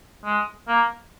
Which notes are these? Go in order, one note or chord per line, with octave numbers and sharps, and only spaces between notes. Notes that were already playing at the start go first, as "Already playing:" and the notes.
G#3
A#3